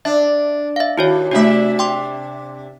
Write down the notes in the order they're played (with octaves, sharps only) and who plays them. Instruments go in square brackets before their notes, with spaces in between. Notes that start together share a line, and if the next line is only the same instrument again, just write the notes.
[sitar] D4 [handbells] E5
[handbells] E5 F5
[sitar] D#2 [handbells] E4 F#4 C#5
[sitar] C3 D4 E5 [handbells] A3 F#4
[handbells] G5 C6 D6